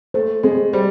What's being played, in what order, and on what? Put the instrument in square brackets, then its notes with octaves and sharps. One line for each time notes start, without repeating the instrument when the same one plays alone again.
[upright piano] A3 [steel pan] C5
[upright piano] G#3 [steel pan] C4
[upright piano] G3 [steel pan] C5